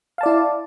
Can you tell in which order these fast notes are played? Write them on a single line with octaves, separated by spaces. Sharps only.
F5 A5 D5 E4